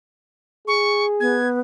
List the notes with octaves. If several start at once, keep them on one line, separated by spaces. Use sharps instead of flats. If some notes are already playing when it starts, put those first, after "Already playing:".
G#4 C#6
B3 G#6